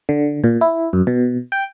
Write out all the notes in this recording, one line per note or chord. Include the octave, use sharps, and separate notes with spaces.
D3
A#2
E4
F#2
B2
G5